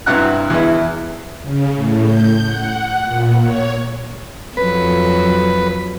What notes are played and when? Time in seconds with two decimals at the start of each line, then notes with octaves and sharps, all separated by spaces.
0.06 G2 C3 E4 F#5 A#5 F#6
0.50 E2 E3 E4
1.43 C#3
1.75 A2
2.06 G6
2.45 F#5
3.04 A#2
3.41 C#5
4.57 F2 F#3 B4